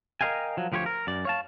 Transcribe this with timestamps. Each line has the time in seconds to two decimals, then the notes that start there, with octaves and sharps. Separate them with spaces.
0.21 A#4 C5 D#5 F5 G5 G#5
0.57 F3 F#3
0.72 D2 F3 G4 B4 C#5
0.86 A#4
1.07 F#2 D5
1.25 C#5 F5 A5